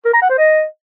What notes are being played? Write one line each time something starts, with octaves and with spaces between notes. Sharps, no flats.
A#4
A#5
F#5
C5
D#5